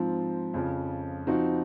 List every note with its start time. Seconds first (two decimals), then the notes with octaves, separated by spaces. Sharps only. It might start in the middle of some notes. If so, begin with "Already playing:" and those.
Already playing: G#2 F3 C4 F4
0.54 F2 C#3 F3
1.27 F3 C4 D#4 F#4